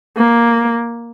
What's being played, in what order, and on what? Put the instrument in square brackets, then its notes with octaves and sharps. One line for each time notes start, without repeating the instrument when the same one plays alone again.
[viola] A#3